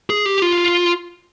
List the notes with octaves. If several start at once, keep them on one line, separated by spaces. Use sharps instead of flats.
G#4
G4
F4